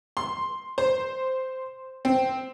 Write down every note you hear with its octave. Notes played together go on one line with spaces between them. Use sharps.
C6
C5
C4